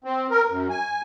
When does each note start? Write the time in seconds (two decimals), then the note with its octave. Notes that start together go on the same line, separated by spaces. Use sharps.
0.04 C4
0.31 A#4
0.49 F#2
0.70 G#5